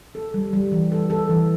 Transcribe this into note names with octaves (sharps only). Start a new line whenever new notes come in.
A4
G3
G3
E3
A4
A4
E3